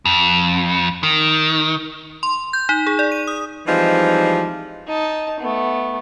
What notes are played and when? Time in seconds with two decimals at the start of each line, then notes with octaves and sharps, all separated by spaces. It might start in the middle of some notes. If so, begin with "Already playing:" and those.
0.05 F2
1.03 D#3
2.23 C6
2.53 G6
2.69 D#4
2.87 G#4
2.99 D5
3.12 D#7
3.27 D#6
3.67 E3 F3 G3 G#3 C4 D#4
4.87 D#4 A5
5.40 A3 B3